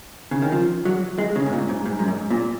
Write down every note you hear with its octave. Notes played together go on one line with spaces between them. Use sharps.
C#3
D#3
F3
F#3
G#3
C#3
G#2
A#2
G#2
G#2
F#2
G#2
A#2